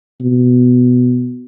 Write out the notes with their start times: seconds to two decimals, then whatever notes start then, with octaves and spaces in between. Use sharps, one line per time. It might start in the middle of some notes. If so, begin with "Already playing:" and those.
0.21 B2